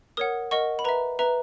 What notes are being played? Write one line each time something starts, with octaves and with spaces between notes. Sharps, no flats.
A#4 C#5 F#5 D#6
A#4 D#5 F#5 C#6
B5
B4 E5 A#5
B4 E5 A#5